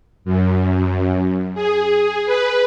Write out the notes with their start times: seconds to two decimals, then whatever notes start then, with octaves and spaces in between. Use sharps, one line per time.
0.25 F#2
1.55 G#4
2.26 B4